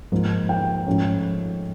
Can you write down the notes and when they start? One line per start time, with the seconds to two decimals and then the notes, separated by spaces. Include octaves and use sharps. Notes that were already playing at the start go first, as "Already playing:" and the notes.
0.12 G#2 F3 A#3
0.49 G5
0.86 G#2 F3 A3 C#4